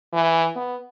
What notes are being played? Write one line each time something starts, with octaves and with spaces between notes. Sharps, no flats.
E3
B3